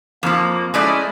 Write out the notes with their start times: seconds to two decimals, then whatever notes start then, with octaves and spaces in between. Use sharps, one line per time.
0.23 F2 F3 A#3
0.74 G#3 A3 C#4 E4 D5 D#5